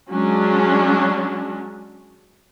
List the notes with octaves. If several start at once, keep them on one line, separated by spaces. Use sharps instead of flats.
F#3 G#3 C#4 D4